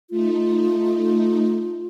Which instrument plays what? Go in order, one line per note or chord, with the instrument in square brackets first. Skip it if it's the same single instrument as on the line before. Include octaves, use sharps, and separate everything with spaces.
[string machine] A3 D#4 [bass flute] F4